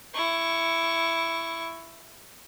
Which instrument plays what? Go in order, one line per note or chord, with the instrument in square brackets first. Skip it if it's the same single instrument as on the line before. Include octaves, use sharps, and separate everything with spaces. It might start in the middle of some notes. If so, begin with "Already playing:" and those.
[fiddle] E4 C#6